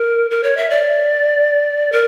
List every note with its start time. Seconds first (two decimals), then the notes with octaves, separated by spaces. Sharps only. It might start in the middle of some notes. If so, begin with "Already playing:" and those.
Already playing: A#4
0.31 A#4
0.43 C#5
0.57 E5
0.70 D5
1.92 A#4